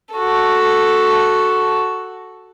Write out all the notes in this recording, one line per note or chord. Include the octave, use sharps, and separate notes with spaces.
F#4 A4